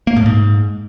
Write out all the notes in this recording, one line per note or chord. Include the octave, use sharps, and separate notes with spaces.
A#3
A2
G#2